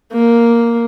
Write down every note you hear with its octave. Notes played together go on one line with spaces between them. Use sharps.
A#3